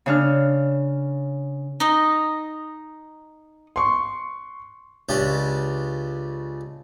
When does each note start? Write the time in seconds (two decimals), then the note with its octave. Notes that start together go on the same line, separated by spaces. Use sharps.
0.06 C#3 D4 F6
1.80 D#4 D#5
3.76 C6 C#6
5.09 C#2 C#3 D4 G4